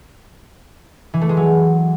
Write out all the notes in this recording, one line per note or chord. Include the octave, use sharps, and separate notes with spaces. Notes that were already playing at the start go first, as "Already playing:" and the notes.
E3
A3
G#3
F#3